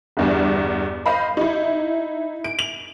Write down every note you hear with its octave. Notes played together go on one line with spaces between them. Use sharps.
G1 E2 G2
C5 D#5 F5 B5
D#4 E4
D7
F7